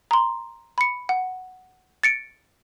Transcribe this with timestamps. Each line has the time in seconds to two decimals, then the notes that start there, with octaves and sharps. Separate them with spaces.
0.11 A#5 C6
0.78 B5 C#7
1.09 F#5
2.03 A6 C#7 D7